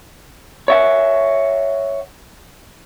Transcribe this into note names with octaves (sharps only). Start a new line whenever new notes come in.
C#5 E5 F#5